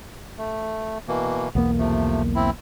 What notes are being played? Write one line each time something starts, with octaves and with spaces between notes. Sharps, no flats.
A3
B2 E3 A#3
B1 E2 A#3 B3
C3 F3 A3
C4 E4